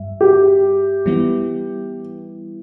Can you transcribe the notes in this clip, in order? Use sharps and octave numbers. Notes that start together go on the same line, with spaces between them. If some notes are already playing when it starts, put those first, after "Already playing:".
Already playing: G2 G3 E5
G4
E3 G3 B3 E4